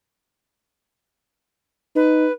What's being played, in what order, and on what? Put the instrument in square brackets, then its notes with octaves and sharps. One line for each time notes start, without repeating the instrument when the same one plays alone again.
[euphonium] D#4 [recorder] B4